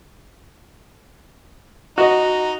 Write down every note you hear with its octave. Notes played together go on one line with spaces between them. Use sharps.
D#4 F#4 D#5